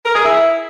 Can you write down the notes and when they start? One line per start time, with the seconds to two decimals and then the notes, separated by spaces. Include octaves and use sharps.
0.06 A#4
0.15 G#4
0.25 E4